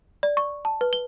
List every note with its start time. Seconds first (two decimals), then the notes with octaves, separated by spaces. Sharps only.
0.23 D5
0.37 C#6
0.65 A5
0.81 B4
0.93 G7